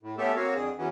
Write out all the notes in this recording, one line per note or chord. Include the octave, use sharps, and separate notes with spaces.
A2
A3 B3 C#4 G4 A4 E5
A#3 C4 F#4 C#5 F5
F2 D3 G#4
E2 E3 F#3 B3 C#4